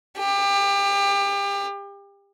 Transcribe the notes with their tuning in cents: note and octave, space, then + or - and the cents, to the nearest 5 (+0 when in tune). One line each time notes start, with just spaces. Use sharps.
G4 +30